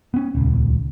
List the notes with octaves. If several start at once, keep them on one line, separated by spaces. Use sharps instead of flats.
B3 C#4
D#1 C#2